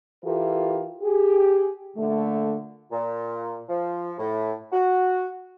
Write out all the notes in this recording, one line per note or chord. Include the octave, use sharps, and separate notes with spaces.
E3 F4 G4 A4 A#4
G4 G#4
A#2 D3 A3
A#2
F3
A2
F#4